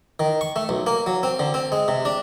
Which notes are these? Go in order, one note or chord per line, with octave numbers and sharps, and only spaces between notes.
D#3
C#6
A3
B1
A#3
F#3
C4
D3
C4
G#3
C3
D4